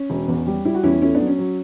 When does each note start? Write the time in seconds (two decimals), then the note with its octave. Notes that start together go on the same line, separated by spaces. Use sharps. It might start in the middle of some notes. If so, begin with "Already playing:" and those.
Already playing: C#4
0.10 E1
0.28 E2
0.47 G3
0.65 G3 E4
0.74 F#4
0.83 E2 C#4 E4
1.02 A3 C#4 E4
1.14 B3 D4
1.20 F#3
1.27 C#4
1.38 F#3